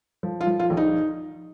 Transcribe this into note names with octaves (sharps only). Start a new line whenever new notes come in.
F3
F4
F3
F4
A#1
D#4